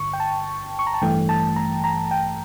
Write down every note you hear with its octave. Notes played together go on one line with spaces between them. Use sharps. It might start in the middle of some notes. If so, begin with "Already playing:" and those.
Already playing: G1 G2 D3 C#6
G5
A5
C#6
A#5
A5
A1 G2 E3 A3 G5
A5
A#5
A#5
G5